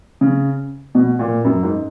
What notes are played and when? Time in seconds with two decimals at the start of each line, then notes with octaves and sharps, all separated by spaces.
0.21 C#3
0.95 B2
1.19 A#2
1.44 F#2
1.63 G#2